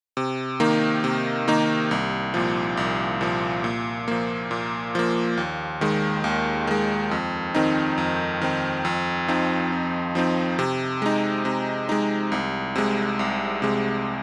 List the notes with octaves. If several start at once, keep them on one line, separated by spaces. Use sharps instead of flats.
C3
D#3 A#3 D#4
C3
D#3 A#3 D#4
C2
A#2 F3
C2
A#2 F3
A#2
F3 A#3
A#2
F3 A#3
D#2
D#3 G#3
D#2
D#3 G#3
F2
D#3 C4 D#4
F2
D#3 C4 D#4
F2
F3 C4 D#4
F2
F3 C4 D#4
C3
G#3 D#4
C3
G#3 D#4
C2
C3 G#3
C2
C3 G#3